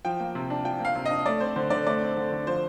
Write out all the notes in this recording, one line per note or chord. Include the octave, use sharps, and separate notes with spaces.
F3 G5
A#3
C3
D4
F3 G5
A#3 F5
C3
D4 D#5
A3 D5
C4 C5
D3 C5
D3 D5
A3 D5
C4
D3
D3
F3 C5